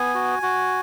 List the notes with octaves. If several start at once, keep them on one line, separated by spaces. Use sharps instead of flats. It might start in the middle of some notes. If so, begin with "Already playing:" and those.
Already playing: B3 G#5
F#4
F#4